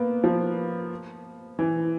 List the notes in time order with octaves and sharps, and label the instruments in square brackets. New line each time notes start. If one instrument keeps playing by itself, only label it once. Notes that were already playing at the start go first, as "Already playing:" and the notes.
Already playing: [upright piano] A#3 B3
F3
E3